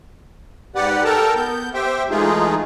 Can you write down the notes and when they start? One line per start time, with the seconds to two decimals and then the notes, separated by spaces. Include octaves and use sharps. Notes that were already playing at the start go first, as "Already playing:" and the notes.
0.75 G#2 G4 B4 D5 F#5
1.04 A4 A#4 G5 A5 A#5
1.36 B3 G6
1.74 G4 C5 E5 G5
2.10 E3 G#3 A3 D#4 F4 G#4